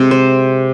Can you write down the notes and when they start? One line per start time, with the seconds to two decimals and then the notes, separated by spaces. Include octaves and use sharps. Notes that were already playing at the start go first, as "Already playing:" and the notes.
Already playing: C3 G#3
0.11 C5